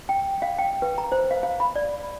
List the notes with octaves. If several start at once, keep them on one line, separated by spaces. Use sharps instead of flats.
G5
F5
G5
B4
A#5
C5
F5
F5
B5
D5